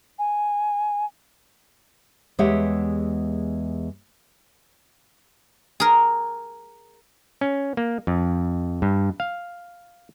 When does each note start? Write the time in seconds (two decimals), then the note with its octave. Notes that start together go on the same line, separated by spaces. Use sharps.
0.19 G#5
2.39 E2 G#3 G4 C#5 E5 F#5
5.80 G#4 A#4
7.41 C#4
7.77 A#3
8.07 F2
8.82 G2
9.20 F5